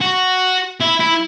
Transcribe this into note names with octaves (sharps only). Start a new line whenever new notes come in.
F#4
E4
E4